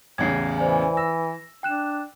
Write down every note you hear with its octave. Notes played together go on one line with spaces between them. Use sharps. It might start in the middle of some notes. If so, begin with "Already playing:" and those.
A1 E2 C#3 G#6 C7
E3 C5 D5 G#5
E6 A#6
D4 G5 F#6 E7